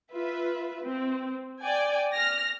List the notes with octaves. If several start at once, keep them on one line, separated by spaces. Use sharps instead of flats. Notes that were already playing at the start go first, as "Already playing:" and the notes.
F4 B4 E5
C4
D5 G5 G#5
F6 A#6